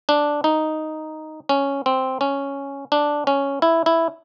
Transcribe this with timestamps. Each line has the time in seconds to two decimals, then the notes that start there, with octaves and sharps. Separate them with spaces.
0.09 D4
0.44 D#4
1.49 C#4
1.86 C4
2.21 C#4
2.92 D4
3.27 C#4
3.62 E4
3.86 E4